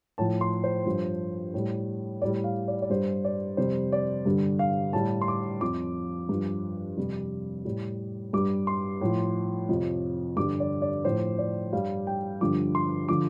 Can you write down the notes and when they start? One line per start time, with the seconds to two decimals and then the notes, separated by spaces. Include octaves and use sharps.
0.18 A2 F3 A5
0.41 C6
0.64 C5
0.86 G2 F3
1.54 A2 G3
2.22 A2 G3 D5
2.44 F5
2.68 D5
2.82 D5
2.90 G2 G3 C5
3.25 D5
3.57 F2 C3 G3 C5
3.92 D5
4.26 G2 D3 G3
4.59 F5
4.93 A2 G3 A5
5.21 C6
5.28 D6
5.61 F2 F3 D6
6.29 G2 F3
6.97 F2 C3 G3
7.65 A2 G3
8.33 G2 G3 D6
8.67 C6
9.01 A2 F3
9.69 F2 C3 F3
10.37 G2 D3 G3 D6
10.60 D5
10.82 D5
11.05 A2 F3 C5
11.38 D5
11.73 G2 G3 F5
12.07 G5
12.41 G2 D3 F3 D6
12.75 C6
13.09 D3 F3 D6